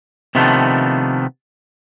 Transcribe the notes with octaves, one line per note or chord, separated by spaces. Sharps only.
C3 D#3 F3 A3 B3 D4